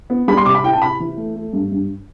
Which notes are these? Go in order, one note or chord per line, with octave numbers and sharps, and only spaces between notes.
B3
G3 B5
C6
C3 D6
B5
E4 G5
A5
C3 B5
E3
A3
A3
G2
G2